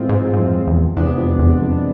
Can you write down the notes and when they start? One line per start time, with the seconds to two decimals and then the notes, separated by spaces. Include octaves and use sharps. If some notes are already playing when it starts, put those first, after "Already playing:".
Already playing: A2 E3 G#3 C4 F4
0.09 G#2
0.33 G#2
0.38 F2
0.67 E2
0.97 E2 C3 G#3 B3 D4
1.18 F2
1.39 E2
1.62 F2